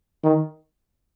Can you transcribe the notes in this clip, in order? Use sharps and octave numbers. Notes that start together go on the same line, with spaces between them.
D#3